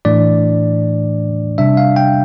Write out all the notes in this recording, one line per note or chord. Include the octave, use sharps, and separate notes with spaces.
A2 E3 A3 D4 D5
C3 G3 D4 E5
F5
G5